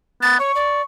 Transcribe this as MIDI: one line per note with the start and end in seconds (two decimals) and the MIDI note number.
0.22 0.40 59
0.22 0.39 93
0.40 0.52 73
0.40 0.83 85
0.55 0.82 74